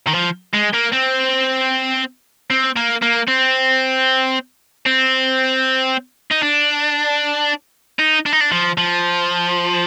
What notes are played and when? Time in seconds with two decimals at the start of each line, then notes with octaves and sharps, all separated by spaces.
0.07 D#3
0.14 F3
0.54 G#3
0.74 A#3
0.93 C4
2.50 C4
2.76 A#3
3.02 A#3
3.28 C4
4.86 C4
6.31 D#4
6.42 D4
7.99 D#4
8.26 D4
8.32 D#4
8.41 D4
8.52 F3
8.78 F3